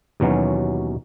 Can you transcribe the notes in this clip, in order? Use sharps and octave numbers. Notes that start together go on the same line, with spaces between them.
D#2 B2 E3 F#3 C#4